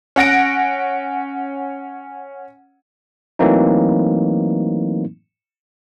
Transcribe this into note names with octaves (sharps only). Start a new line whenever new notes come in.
C#4 F#5 A#6 D7
E3 F#3 A3 A#3 C4 D#4